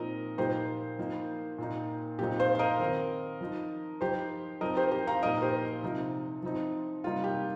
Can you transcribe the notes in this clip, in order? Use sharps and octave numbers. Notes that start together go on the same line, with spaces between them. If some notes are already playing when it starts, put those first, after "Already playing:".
Already playing: A#2 F3 C4 D#4 A#4 D#5
A#2 F3 A#3 D#4 G4 C5
F3 A#3 D#4
A#2 A#3 D#4
A#2 F3 C4 D#4 G4
C5 F5
F5
A#4 D#5
D#3 C4 D#4
F3 D#4
F3 D#4 G4 C5
F3 C4 D#4 A#4 D#5
G4 C5
G4
F5 A#5
A#2 F3 D#4 A#4 D#5
G4 C5
C3 F3 D#4
F3 C4 D#4
C3 G3 A#3 D#4 F4
G4